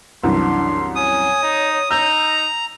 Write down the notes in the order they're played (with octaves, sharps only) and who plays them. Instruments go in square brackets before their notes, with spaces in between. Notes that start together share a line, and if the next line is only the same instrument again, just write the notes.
[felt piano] C2 F#2 E3 [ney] D4 [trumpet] C6
[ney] C#5 [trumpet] G#5 [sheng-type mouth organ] D#6
[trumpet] D#4
[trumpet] D#4 [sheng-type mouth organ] A#5 [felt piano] E6 G6